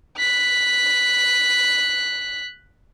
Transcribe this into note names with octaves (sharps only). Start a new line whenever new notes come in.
F#6 B6